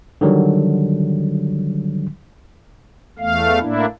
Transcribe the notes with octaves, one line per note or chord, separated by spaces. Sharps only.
D3 D#3 F#3 G3
E2 A3 F5
A2 A#3 D4 E4